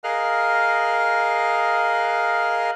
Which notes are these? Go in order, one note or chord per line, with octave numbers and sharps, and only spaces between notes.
G#4 A#4 D#5 F5 F6 F#6